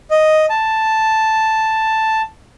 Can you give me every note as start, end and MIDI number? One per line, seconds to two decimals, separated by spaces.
0.11 0.46 75
0.50 2.22 81